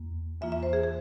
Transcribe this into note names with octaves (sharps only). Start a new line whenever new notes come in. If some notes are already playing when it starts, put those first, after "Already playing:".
Already playing: E2 A#3
E2 E3 A#3 F4 E5
E5
C5
G#4
G#4